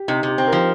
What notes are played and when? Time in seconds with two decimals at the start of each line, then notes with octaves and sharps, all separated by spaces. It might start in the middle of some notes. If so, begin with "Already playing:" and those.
Already playing: G4
0.08 C3 D#4
0.23 C3
0.28 G4
0.38 C4
0.47 F3 A#4